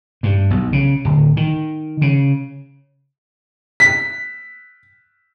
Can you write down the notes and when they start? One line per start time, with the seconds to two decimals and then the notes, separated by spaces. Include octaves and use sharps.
0.23 G2
0.51 B1
0.73 C#3
1.05 D1
1.37 D#3
2.02 C#3
3.80 B6